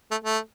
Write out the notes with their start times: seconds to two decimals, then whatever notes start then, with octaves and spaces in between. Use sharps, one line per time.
0.11 A3
0.25 A3